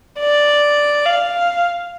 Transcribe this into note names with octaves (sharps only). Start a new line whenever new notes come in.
D5
F5